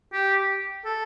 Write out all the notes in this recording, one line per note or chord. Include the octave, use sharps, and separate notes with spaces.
G4
A4